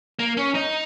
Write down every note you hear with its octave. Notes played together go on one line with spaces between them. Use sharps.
A#3
C#4
D#4